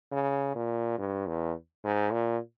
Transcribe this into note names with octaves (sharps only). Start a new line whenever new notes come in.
C#3
A#2
G2
E2
G#2
A#2